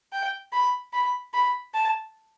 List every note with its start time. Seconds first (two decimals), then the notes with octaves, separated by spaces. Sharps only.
0.12 G5
0.53 B5
0.93 B5
1.34 B5
1.74 A5